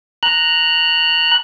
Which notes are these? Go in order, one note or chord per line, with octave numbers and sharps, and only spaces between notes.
A#5 F#6